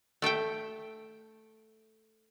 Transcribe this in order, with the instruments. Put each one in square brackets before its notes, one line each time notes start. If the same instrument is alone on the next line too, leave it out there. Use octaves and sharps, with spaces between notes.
[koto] A3 A4 E5 G5